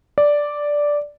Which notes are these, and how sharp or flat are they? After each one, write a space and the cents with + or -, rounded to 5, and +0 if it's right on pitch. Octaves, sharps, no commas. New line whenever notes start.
D5 -5